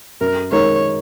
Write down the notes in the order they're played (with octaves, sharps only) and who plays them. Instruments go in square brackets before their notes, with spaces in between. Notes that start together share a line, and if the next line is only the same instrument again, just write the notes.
[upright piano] F#2 [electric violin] A#4
[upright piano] D#3 G#3 D#4 A#4 [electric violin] C#5